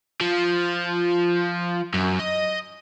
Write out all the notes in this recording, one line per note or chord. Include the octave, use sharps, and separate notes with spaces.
F3
F#2
D#5